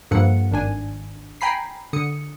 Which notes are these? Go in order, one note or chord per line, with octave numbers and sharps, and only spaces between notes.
G2 F3 A#3 A4 F#5 C#7
G#1 D#3 D4 G#5
G5 G#5 A#5 B5 B6 C7
D3 D#6 C#7